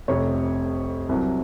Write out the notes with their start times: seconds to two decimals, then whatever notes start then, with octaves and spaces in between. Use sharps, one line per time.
0.08 F1 F2 C3 C#5
1.09 C2 C3 F#3